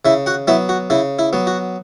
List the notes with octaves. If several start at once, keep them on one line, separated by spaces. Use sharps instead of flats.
C#3 E4 E5
F#4 F#5
F#3 B3 E4 E5
F#4
C#3 E4
E4
F#3 B3
F#4